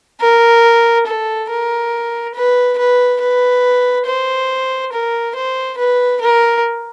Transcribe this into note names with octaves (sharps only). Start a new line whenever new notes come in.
A#4
A4
A#4
B4
B4
B4
C5
A#4
C5
B4
A#4